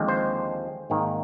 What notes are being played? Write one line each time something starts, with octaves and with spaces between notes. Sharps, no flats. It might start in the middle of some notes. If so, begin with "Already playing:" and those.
Already playing: D#2 D3 F3 G#3 C4
C5
G#1 G#2 D#3 A#3